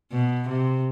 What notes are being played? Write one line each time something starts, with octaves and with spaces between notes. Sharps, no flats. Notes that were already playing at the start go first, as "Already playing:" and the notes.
B2
C3